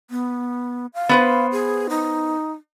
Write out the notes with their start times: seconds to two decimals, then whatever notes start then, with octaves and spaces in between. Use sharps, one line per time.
0.10 B3
0.94 F5
1.09 B3 B4 C5
1.52 G#4
1.89 D#4